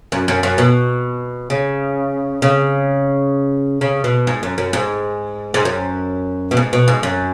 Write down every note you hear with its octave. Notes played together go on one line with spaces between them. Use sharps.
F#2
F#2
F#2
B2
C#3
C#3
C#3
B2
G#2
F#2
F#2
G#2
G#2
F#2
B2
G#2
B2
G#2
F#2